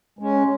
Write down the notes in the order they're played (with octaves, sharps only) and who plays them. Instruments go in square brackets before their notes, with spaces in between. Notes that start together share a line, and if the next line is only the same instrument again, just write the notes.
[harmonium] G#3 C#4